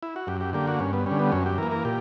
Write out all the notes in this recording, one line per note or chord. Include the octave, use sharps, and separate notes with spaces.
E4
F#4
F#2 G4
G4
D3 A#3 G4
F#4
G2 C#4
B3
D3 G3 C#4
B3
F#2 C#4
G4
E3 A#3 A#4
A#4
A#2 G4